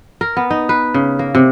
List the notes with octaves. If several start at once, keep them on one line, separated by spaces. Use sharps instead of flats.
A#4
B3
D#4
B4
C#3
A#3
C3